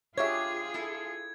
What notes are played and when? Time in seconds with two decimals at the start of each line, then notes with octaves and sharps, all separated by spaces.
0.18 D4 F4 G4 G#4 C5 C#5 E5 G#6
0.74 E4 A4